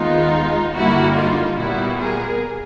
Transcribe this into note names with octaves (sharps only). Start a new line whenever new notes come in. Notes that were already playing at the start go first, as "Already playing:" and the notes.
Already playing: D#2 D#3 G#3 B3 D#4 F4
G2 D3 G3 A#3 E4 F#4
D#4 F4
A#2 G3 B3 E4 F#4
G#4 A#4